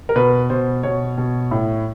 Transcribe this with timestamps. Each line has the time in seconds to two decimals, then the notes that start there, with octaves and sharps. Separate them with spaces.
0.09 A#4
0.16 B2 B4
0.50 B2 C5
0.83 B2 C#5
1.18 B2
1.51 A2